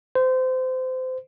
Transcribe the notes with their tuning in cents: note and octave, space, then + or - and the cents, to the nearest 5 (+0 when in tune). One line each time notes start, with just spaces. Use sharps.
C5 -25